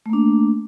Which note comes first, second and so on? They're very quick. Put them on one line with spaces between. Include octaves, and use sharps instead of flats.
A3 A#3 D4